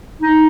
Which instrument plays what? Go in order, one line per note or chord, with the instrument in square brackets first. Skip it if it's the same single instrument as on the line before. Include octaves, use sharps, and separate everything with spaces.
[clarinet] D#4